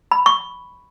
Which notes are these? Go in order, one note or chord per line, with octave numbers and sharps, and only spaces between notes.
B5
C#6